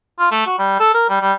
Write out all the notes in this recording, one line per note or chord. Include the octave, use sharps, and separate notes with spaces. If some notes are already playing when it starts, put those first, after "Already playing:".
F4
A3
F#4
G3
A4
A#4
G3
G3